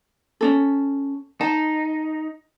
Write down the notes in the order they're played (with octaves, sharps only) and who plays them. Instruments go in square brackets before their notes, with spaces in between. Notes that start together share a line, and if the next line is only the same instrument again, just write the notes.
[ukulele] C#4 D4 A4
[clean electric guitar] D#4 [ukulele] A5